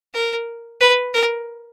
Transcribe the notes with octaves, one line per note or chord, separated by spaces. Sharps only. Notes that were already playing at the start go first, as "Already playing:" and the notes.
A#4
B4
A#4